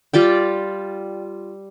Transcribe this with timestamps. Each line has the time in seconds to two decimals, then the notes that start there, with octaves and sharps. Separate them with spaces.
0.13 G3 F4 D5 G5